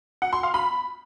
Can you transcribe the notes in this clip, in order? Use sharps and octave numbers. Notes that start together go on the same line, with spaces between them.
F#5
C6
F5
B5